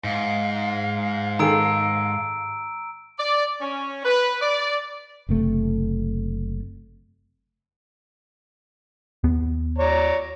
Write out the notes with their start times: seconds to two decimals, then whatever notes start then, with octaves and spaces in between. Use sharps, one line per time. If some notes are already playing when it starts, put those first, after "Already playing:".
0.04 G#2 F5
1.39 D#3 G#4 A4 A#5 E6 D7
3.19 D5
3.60 C#4
4.04 B4
4.41 D5
5.29 F#1 C3 A3
9.24 D#2 B3
9.78 C#5 D5 A#5